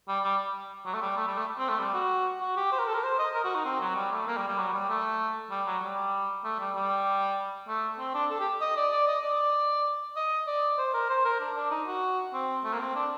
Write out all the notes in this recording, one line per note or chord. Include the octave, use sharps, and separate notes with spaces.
G3
G3
F#3
A3
G3
A3
G3
A3
C4
A3
G3
F#4
F#4
G4
C5
A#4
A4
A#4
C5
D#5
A#4
F#4
D#4
C4
F#3
G3
A3
A#3
G3
G3
F#3
G3
A3
G3
F#3
G3
A3
G3
G3
A3
C4
D4
A4
G4
D#5
D5
D5
D#5
D5
D#5
D5
C5
A#4
C5
A#4
D4
D4
D#4
F#4
C4
A3
A#3
C4
D4